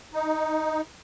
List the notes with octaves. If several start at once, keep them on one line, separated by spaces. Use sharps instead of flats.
D#4